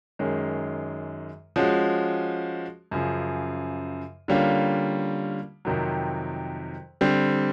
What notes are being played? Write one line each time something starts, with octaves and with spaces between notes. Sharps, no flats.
F#2 D#3 G#3 C#4
F3 G#3 C#4 F#4
F#2 C#3 F3
D3 G3 A#3 C#4 F4
F2 C3 D#3 F#3
D3 G3 C4